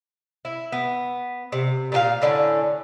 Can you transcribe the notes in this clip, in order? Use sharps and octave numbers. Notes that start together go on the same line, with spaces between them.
E4
B3
C3
A#2 F4 F5
A2 D3 A3 C#4